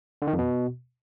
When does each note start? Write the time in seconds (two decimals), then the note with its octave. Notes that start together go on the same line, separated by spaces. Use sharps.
0.22 D3
0.27 D#3
0.33 F2
0.39 B2